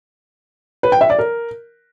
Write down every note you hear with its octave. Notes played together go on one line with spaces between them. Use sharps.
B4
G5
E5
D5
A#4